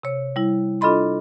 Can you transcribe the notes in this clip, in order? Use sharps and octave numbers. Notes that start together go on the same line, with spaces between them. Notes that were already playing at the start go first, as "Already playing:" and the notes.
C3 C#5
G3 E4
D4 F4 A4 D#5 B5 C6